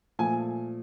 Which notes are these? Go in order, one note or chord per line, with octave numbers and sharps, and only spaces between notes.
A#2 F3 A3 G#5